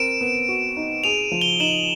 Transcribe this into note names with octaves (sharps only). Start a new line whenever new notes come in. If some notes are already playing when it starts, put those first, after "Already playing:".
Already playing: C4 A#4 D7 E7
B3
F#4
D#4
G#4 D#7 F7
F3
F7 G7
D#4 E7 F#7